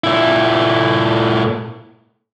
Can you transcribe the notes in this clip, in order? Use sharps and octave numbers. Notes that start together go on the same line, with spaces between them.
A#2 E4